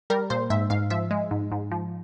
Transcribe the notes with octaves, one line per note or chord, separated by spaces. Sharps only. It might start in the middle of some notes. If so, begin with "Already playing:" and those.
G3 A#4
A#2 C5
G#2 E5
G#2 F5
F3 E5
G#3
G#2
G#2
F3